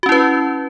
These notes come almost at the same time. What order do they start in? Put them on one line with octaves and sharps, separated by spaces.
F#4 C#4 E4 B4